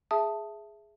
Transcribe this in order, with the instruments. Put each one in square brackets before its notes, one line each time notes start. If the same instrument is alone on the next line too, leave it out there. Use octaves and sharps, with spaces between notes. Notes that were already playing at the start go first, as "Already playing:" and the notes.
[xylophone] G#4 E5 A5 D#6